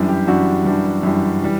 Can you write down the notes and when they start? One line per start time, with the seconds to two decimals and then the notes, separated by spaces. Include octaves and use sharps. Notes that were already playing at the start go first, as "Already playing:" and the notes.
Already playing: F#2 E3 G3 D4
0.08 G4
0.27 F#2 E3 G3 D4 F#4
0.65 F#2 E3 G3 D4
1.03 F#2 E3 G3 D4
1.42 E3 G3